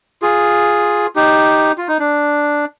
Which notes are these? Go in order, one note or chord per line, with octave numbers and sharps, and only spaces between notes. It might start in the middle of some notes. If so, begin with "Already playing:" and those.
F4 G#4
D#4 G4
F4
D#4
D4